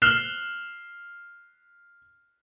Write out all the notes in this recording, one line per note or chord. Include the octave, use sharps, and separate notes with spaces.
F6 F#6 C7 E7 F7 G7